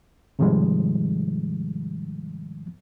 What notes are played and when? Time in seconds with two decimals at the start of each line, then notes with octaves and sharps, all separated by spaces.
0.39 G#2 C3 D#3 F3 G3 G#3